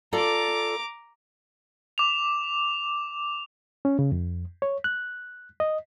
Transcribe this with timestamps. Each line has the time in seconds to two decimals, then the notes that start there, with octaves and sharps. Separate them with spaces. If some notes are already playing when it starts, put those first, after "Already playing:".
0.13 F4 A4 D5 A#5 D6
1.98 D6 F7
3.85 C#4
3.99 C#3
4.12 F2
4.62 C#5
4.84 F#6
5.60 D#5